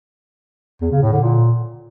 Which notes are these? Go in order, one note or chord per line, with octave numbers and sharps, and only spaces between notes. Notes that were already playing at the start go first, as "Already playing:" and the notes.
E2
C#3
A2
D3
A#2